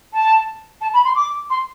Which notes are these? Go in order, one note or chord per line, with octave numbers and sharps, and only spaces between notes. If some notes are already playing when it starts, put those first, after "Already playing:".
A5
A5
B5
C6
D6
C6